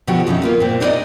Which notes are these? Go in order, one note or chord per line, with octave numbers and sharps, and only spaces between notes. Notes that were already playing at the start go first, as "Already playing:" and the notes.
B2 D3 F3 F#4 G4
F2 C#3 D#4 E4
A#3 B3 F4
A#2 C4
D4 D#4 F#4 C5 D5 D#5